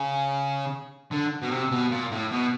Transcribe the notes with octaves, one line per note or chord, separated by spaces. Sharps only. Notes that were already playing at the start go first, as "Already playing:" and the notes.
Already playing: C#3
D3
B2
C3
B2
A#2
A2
B2